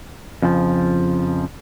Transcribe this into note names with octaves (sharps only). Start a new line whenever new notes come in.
F2 C#3 F3